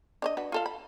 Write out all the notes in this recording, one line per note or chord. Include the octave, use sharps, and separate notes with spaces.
D4 C#5 D#5
D4 F#4 B4
F4 A4 F5
B5